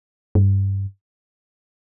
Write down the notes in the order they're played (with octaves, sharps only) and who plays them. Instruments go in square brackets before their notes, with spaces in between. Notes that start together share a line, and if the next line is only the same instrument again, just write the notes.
[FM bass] G2